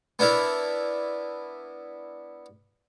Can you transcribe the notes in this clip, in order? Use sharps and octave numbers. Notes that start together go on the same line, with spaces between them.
B3 D4 E4 A#4